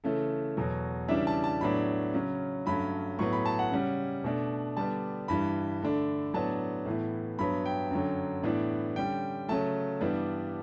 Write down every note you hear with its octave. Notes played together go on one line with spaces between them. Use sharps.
C#3 E3 A3 A4
E2 B2 F#3
C#3 E3 G3 D4 E5
A5
A5
A2 F#3 B3 D4 B5
C#3 F#3 C#4
G2 F#3 A3 C#4 B5
A2 F#3 B3 C#6
B5
A5
F#5
C#3 G3 C#4
B2 A3 D4
D3 G3 B3 D4 A5
G2 E3 G3 B5
D3 A3 D4
A2 F#3 B3 D4 A5
A2 E3 B3
G2 F#3 B3 B5
G5
F#2 D3 F#3
A2 E3 B3 D4
D3 G3 C#4 G5
C#3 F#3 A3 A5
G2 E3 G3 B3 D4